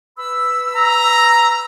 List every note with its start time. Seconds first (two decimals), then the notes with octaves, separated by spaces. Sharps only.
0.18 B4 B5 E6
0.75 A#5